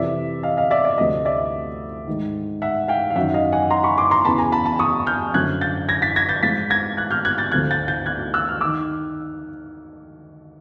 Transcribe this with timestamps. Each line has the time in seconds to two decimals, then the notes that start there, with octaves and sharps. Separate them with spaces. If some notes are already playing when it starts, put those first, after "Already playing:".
Already playing: F2 C3 E3 D5 E5
0.43 D#5 F5
0.57 D#5 F5
0.71 D5 E5
0.85 D5
0.98 D2 C3 F3 D#5
1.25 D5 E5
2.07 G#2 D#3
2.62 E5 F#5
2.88 F5 G5
3.10 F5
3.16 F#2 E5 F#5
3.20 D#3
3.34 D#5 F5
3.52 F#5 G#5
3.70 A#5 C6
3.84 B5 C#6
3.98 C6 D6
4.11 A#5 C6
4.25 E2 C#3 E3 A5 B5
4.38 G#5 A#5
4.52 A5 B5
4.65 A5 B5
4.79 C#6 D#6
5.07 F6 G6
5.34 F#2 D3 F3 F#6 G#6
5.61 G6 A6
5.89 G#6 A#6
6.02 A6 B6
6.16 G#6 A#6
6.29 G6 A6
6.43 G#2 F3 A6 B6
6.70 G#6 A#6
6.97 F#6 G#6
7.11 F6 G6
7.25 F#6 G#6
7.38 G6 A6
7.52 D2 D3 F3 F#6 G#6
7.71 G6 A6
7.88 G6 A6
8.06 F#6 G#6
8.34 E6 F#6
8.49 F6
8.61 D6 E6
8.64 D#3